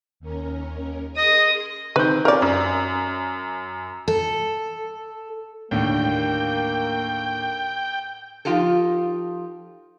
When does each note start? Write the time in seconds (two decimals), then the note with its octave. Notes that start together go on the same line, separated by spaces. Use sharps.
0.20 D#2 C#4 A#4
1.17 G#4 A#4 D#5 C6 D#6
1.96 D#3 C4 B4 G6
2.25 C4 C#4 F4 A#4 D5
2.42 F#2
4.08 A4
5.71 D#2 A2 D3 A#3 G5
8.45 F3 D#4 F4 G4 A4